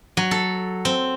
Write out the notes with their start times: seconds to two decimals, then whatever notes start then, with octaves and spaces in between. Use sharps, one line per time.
0.17 F#3
0.31 A4
0.85 C4